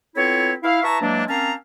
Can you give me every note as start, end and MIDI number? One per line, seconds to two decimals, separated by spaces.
0.16 0.53 59
0.16 0.53 60
0.16 0.53 64
0.16 0.53 65
0.16 0.53 69
0.16 0.53 73
0.63 0.82 64
0.63 0.82 77
0.83 1.01 64
0.83 1.01 71
0.83 1.01 76
0.83 1.01 81
0.83 1.01 82
0.83 1.01 85
1.01 1.23 52
1.01 1.23 54
1.01 1.23 56
1.01 1.23 58
1.01 1.23 62
1.29 1.52 58
1.29 1.52 60
1.29 1.52 61
1.29 1.52 77
1.29 1.52 81
1.29 1.52 82